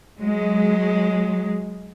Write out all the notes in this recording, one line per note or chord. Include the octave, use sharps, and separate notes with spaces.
F#3 G#3